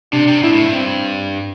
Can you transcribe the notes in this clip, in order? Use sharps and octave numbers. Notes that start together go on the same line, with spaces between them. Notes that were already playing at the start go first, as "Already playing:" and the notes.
C3 D4
C3
B2 E4
A2
G2
C4